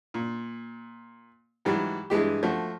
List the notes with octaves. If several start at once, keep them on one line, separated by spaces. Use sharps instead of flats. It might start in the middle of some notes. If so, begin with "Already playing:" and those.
A#2
G#2 E3 F#3 G3
G2 E3 G#3 G4
F3 A3 F#4